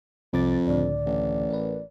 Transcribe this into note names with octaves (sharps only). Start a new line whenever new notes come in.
C2 F2 D6 A6
C#2 A2 D3 D5
A1
A#4 B4